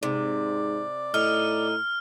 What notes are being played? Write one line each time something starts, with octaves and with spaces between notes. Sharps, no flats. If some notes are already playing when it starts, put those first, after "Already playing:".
G#2 C3 D5
A2 D#4 F6